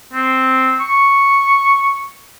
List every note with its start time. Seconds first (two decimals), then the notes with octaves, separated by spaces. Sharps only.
0.13 C4
0.80 C#6